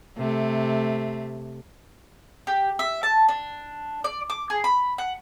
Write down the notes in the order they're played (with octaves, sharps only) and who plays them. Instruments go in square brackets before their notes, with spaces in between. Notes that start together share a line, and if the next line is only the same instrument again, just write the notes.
[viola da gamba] C3 A3
[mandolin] G4
E5
A5
D4
D5
D6
G#4
B5
F#5